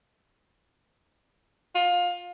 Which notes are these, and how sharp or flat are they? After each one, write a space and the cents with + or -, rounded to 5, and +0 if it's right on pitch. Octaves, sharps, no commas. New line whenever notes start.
F4 +25